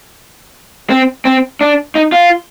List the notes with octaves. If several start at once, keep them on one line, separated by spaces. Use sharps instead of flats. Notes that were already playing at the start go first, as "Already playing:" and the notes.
C4
C4
D4
D#4
F4